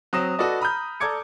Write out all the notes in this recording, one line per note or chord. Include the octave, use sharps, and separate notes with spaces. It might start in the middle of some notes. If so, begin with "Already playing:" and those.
F#3 C4 D#6 A#6 E7
F#4 A4 B4 D5 D#5
A#5 B5 D#6 F6 G6
A4 D5 A#5 D6 G#6 C#7